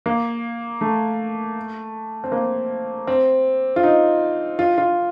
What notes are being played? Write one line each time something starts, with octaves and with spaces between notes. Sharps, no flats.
A#3
A3
C4
A#3
C4
F4
D#4
F4
F4